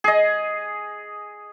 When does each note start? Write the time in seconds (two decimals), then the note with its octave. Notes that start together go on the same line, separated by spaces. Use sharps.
0.04 G#4 D#5